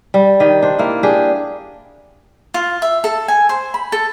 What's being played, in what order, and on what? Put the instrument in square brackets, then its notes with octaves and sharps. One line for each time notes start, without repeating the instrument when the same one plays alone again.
[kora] G3
D#3 G4 D#5
D4 C5
A#3 E4
D4 G4 G#4
[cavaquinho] F4
E5
A4
G#5
C5
B5
A4